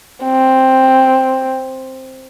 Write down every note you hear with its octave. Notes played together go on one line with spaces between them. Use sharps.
C4